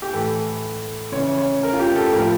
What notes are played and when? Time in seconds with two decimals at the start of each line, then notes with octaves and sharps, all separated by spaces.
0.02 G4
0.13 A2 E3 A4
1.12 C#3 E3 C#5
1.38 C#5
1.63 A#4
1.73 F4
1.80 G4
1.96 A4
2.12 A2 A#4
2.16 F3